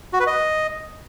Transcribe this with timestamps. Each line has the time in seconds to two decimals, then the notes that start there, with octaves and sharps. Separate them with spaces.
0.13 F#4
0.20 B4
0.27 D#5